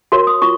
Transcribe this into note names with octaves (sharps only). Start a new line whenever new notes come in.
F#4 A#4 C#5 C6
D#6
F4 C#6